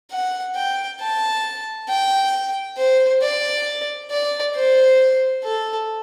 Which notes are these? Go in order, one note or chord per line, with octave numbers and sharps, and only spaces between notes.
F#5
G5
A5
G5
C5
D5
D5
C5
A4